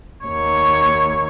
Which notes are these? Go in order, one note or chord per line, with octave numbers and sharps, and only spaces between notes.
D#2 C#5